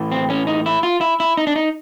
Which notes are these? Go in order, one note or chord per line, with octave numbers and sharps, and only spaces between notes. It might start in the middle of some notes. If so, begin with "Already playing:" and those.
Already playing: A2 E3
C4
C#4
D#4
E4
F4
E4
E4
D#4
D4
D#4